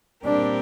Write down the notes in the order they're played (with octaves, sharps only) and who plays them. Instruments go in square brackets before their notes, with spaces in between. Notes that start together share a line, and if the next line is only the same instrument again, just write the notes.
[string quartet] A#2 G3 C4 G4 A#4 [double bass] D4